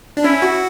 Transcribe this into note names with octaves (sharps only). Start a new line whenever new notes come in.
D4
C#4 E4
F#4